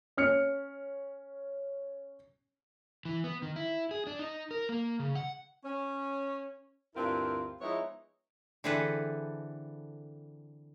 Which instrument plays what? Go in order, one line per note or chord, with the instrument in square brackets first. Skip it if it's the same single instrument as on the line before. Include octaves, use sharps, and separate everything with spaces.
[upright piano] C#4 F6 C#7
[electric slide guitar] E3
B3
D#3
E4
G#4
D4
D#4
A#4
A#3
C#3
F#5
[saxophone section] C#4
D2 G2 C4 E4 F4 A#4
F3 G#3 B3 D#4 E4 C#5
[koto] D3 E3 C4 G#4 A4 B4